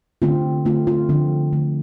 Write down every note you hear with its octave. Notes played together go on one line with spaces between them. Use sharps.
D3 A3 C4 F4
D3 A3 C4 F4
C4 F4
D3 F3 A3 C4
D3 F3 A3